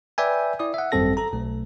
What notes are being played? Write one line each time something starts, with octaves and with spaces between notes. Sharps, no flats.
B4 D5 E5 G5 G#5
E4 D5 D#6
E5 F#5
G#1 F#2 G3 C4 A4 A#6
A4 A#5
B1 A3